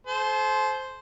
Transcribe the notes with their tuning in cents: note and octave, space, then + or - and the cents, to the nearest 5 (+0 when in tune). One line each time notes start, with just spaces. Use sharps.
A4 -45 C5 +0